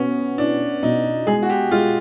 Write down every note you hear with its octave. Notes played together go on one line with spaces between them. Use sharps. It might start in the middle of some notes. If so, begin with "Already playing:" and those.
Already playing: B2 B3 C#4
D4 E4
B2 D#4
G#3 G#4
F#4
G4
G#3 F4